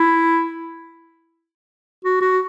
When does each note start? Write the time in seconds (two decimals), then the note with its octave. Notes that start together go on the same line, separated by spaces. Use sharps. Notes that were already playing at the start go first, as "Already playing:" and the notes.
Already playing: E4
2.05 F#4
2.21 F#4